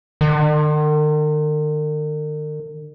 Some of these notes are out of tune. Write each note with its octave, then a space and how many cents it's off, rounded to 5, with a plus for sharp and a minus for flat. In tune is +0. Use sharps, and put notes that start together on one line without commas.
D#3 -45